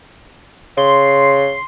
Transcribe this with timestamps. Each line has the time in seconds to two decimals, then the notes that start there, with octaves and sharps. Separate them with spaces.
0.77 C#3 C6